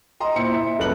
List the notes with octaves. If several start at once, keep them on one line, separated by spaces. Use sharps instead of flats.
D#5 A#5 C6
A#2 E4 C5 C#7
E5
D#1 F#2 A4 B4 F#6 F#7